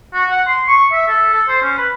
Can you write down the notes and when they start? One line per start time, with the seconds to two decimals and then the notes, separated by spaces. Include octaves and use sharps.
0.14 F#4
0.30 F#5
0.47 C6
0.68 C#6
0.92 E5
1.08 A4
1.34 A4
1.49 C5
1.62 C#4
1.78 B4